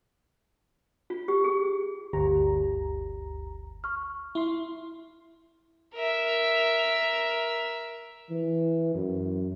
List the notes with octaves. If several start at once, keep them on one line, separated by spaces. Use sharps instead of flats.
F4
G4
G#4
G1 D2 G4 A#5
C#6 F6
E4 C6
A#4 E5
E3
F#2